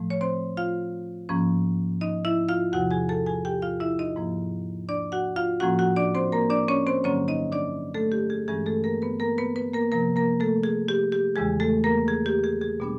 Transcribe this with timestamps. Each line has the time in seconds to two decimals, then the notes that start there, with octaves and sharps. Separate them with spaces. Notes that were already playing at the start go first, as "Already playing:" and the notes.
Already playing: A2 F3 A3
0.10 C#5
0.21 C4 C5
0.57 F4 F5
1.29 G#2 F3 A#3 C#4
2.01 D#4 D#5
2.25 E4 E5
2.49 F4 F5
2.72 E2 C3 F3 F#4 F#5
2.91 G#4 G#5
3.09 A4 A5
3.26 G#4 G#5
3.45 G4 G5
3.62 F4 F5
3.80 E4 E5
3.99 D#4 D#5
4.16 G#2 F3 A#3
4.89 D4 D5
5.12 F#4 F#5
5.36 F4 F5
5.60 A2 F3 A#3 C#4 F#4 F#5
5.79 F#4 F#5
5.96 D4 D5
6.15 C4 C5
6.32 A#3 A#4
6.50 D4 D5
6.68 C#4 C#5
6.87 C4 C5
7.04 G2 D3 F#3 A#3 C#4 C#5
7.28 D#4 D#5
7.52 D4 D5
7.94 A3 A4
8.12 G4
8.30 G#4
8.48 G2 E3 G#3 C#4 G#4
8.66 A3 A4
8.84 A#3 A#4
9.02 B3 B4
9.20 A#3 A#4
9.38 B3 B4
9.56 B3 B4
9.74 A#3 A#4
9.92 C3 F3 A#3 A#4
10.16 A#3 A#4
10.40 A3 A4
10.63 G#4
10.88 G4
11.12 G4
11.36 E2 C#3 E3 G#3 G#4
11.60 A3 A4
11.84 A#3 A#4
12.08 G#4
12.26 G4
12.44 G#4
12.61 G#4
12.80 B2 G3 B3 D4